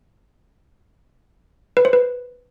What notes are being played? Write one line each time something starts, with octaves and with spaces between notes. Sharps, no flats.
B4
C5
B4